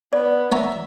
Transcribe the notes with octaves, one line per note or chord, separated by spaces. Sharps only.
B3 D5
B3 C#5 E5 A#5